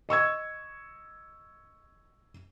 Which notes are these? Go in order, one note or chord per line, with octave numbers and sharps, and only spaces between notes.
D#5 C#6 E6 G#6